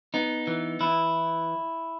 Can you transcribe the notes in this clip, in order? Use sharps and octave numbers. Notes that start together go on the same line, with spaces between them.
B3 D#4
E3
E3 E4